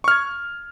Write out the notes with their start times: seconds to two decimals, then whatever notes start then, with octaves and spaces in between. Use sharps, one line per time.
0.04 C#6
0.08 F6
0.11 G#6